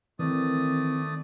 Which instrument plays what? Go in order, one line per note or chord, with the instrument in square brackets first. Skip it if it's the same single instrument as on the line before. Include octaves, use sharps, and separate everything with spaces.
[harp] D#3 [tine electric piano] E3 [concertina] A3 D5 D#6 [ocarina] C4